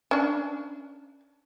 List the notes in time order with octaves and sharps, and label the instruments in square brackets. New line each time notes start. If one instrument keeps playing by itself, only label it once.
[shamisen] C#4 D4